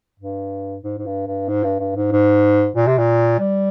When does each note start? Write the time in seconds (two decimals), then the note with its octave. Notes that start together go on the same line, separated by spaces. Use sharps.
0.20 G2
0.84 G#2
0.98 G#2
1.06 G2
1.27 G2
1.49 G#2
1.64 G2
1.80 G2
1.96 G#2
2.12 G#2
2.76 A#2
2.87 C3
2.98 A#2
3.39 G3